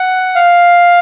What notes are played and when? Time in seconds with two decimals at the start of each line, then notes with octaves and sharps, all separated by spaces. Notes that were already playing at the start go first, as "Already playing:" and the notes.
Already playing: F#5
0.35 F5